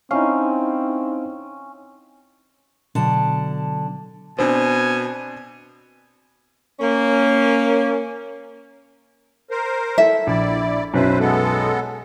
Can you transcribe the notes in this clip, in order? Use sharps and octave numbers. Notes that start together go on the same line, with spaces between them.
C4 C#4 D#4 E4 F5
B2 D3 F#3 A5
B2 C4 D4 G#5
A#3 C#4
A#4 C5
E4 A4 E5
A#1 E4 D5
B1 F#2 E4 B4 C5
G#3 B3 A4